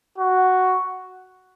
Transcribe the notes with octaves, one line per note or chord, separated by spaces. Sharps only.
F#4